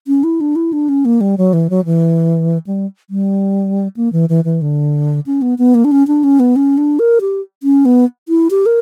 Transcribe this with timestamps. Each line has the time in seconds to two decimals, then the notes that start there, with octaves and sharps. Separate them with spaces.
0.07 C#4
0.23 E4
0.41 D4
0.56 E4
0.73 D4
0.89 C#4
1.05 A#3
1.21 G3
1.38 F#3
1.53 E3
1.70 F#3
1.85 E3
2.66 G3
3.10 G3
3.96 A#3
4.13 E3
4.29 E3
4.44 E3
4.61 D3
5.26 C#4
5.42 B3
5.58 B3
5.74 A#3
5.84 D4
5.91 C#4
6.07 D4
6.23 C#4
6.39 B3
6.56 C#4
6.77 D4
6.99 A#4
7.21 G4
7.63 C#4
7.85 B3
8.28 E4
8.50 G4
8.66 A#4